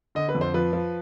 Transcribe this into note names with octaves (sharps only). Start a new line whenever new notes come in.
D3 D#5
B4
F2
C5
F3 B4
F3